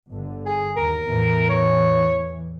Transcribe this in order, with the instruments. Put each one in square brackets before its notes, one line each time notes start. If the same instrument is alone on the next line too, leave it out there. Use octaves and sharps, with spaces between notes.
[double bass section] G1 D3
[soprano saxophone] G#4
[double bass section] D#2 [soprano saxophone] A#4
[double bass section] E2 A2 E3
[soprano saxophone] C#5